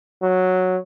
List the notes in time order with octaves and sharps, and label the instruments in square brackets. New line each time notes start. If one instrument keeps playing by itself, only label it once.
[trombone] F#3